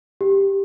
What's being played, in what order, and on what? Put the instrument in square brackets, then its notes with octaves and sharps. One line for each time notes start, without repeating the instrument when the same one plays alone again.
[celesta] G4